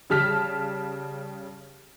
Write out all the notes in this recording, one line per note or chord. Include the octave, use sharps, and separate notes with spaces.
C#3 G3 A5 F6 B6